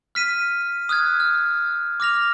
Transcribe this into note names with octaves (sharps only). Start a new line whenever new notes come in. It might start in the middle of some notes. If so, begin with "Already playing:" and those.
F6 B6 D#7
D#6 F6 F#6 G#6
F6
D6 F6 A#6 F7